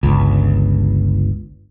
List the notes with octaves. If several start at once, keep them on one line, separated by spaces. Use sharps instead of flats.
G1 C#2